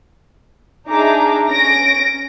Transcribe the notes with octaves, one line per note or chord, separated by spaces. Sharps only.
D4 D#4 G#4 E5 A#5 D6
C#4 A#6 D7